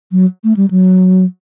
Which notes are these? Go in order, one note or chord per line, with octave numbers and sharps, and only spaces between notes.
F#3
A3
G3
F#3